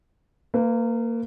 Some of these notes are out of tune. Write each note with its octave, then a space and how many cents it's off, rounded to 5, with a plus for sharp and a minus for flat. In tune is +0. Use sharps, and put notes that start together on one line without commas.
A#3 -20 B4 +20